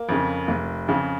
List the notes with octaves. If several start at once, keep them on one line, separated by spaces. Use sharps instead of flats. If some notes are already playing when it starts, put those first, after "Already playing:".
Already playing: A#3
F2 C#3
F1
F2 C#3